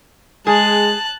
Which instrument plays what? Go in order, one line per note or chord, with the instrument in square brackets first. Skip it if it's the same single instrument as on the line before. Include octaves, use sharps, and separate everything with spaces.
[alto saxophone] G#3 [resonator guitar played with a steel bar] G#4 [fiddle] A5 F#6